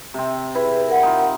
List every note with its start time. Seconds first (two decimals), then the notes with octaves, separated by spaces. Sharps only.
0.14 C3 C4
0.55 E4 G#4 B4
0.88 A#4 F#5
1.03 D#4 F4